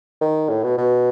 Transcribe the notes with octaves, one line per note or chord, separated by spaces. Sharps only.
D#3
A2
B2
B2